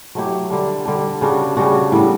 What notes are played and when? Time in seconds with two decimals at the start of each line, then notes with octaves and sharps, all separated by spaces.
0.15 F#3 A3 E4 G4
0.50 D3 G3 D4
0.86 D3 G3 D4
1.21 C#3 G3 D4 F#4
1.57 C#3 G3 D4 F#4
1.92 A2 G3 B3